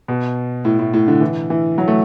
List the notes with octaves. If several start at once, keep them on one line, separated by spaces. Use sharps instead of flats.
B2
A2
A2
A2
D3
E3
E3
F#3
A3